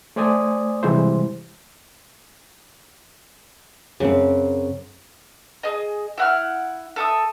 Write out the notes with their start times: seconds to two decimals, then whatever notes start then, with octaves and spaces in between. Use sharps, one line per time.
0.16 A3 C5 D5 G#5 D#6
0.83 C3 E3 G3 G#3 E4 C5
4.00 F#2 C#3 C4
5.63 G#4 D#5
6.18 E4 F#5 F6
6.96 A4 E5 D#6